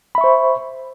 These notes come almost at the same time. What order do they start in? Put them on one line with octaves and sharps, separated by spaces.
B5 E5 C#6 C5